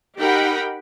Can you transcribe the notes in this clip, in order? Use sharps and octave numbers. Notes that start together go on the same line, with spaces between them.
D#4 G4 A#4 F#5 G5 B5